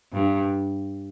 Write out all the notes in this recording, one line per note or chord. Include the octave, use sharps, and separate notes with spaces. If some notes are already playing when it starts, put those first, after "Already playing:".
G2